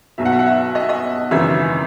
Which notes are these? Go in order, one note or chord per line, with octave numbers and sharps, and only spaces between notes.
B1 B2 E5
F#5
E5
F#5
E5
D#5
E5
D#5
G#1 F#2 C#3 E3 E5